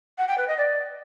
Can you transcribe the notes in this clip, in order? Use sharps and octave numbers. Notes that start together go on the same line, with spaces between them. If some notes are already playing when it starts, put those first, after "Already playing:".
F#5
G5
B4
D#5
D5